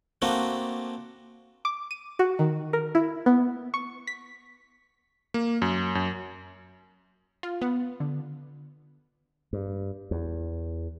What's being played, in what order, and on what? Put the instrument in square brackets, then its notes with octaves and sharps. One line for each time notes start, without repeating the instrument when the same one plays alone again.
[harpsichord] A3 A#3 C4 D4 F#4
[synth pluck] D6
D#7
F#4
D#3
A#4
E4
B3
C#6
B6
[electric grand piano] A#3
F#2
F#2
[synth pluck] F4
B3
D3
[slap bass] G2
E2